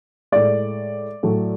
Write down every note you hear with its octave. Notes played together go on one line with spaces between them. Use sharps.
A2 G#3 D5
A2 F#3 A3